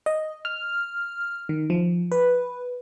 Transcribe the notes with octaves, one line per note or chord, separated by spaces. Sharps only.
D#5
F6
D#3
F3
B4